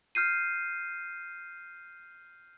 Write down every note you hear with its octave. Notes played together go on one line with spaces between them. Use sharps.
F6 G6 C7 D#7